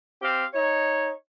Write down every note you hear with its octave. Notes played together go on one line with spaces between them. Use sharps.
C4 G4 F5
D#4 C#5